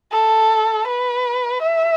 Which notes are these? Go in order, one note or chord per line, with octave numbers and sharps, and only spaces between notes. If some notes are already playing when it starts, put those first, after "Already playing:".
A4
B4
E5